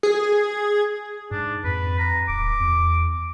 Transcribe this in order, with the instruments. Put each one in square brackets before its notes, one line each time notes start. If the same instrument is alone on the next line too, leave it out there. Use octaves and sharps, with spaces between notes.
[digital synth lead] G#4
[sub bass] G#2 [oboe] D4
[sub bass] F2 [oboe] B4
[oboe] A#5
[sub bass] D1 [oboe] D6
[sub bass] E2